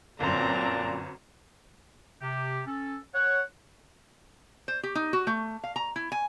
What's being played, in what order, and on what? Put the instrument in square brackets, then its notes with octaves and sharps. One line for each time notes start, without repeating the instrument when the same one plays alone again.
[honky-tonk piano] G1 F#2 [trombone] A#2 [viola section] C4 A#5 [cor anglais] D4
[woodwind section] C3 G4
C#4 A4
C#5 F#5
[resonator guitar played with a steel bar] C5
G4
D#4
F#4
A3
F5
A#5
E4
G#5